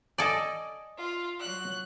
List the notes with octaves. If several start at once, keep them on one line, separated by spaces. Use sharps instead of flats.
A4 D5 D#5 G#5
F4
F#3 F#6